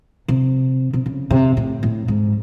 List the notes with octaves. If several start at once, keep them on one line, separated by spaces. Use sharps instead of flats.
C3
C3
C#3
C3
A2
A2
G#2